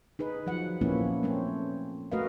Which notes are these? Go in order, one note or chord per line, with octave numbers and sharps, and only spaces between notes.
D#4 G#4 B4
F3 F#3 F#5
A#2 F3 A#3 B3 C#4 E4
A3 C4 C#4
A3 F#4 A#4 B4 D#5 F5